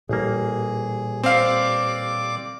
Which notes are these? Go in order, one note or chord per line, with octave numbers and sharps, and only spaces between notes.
A1 A#2 G3 A#3 G#4
C4 D5 F5 D6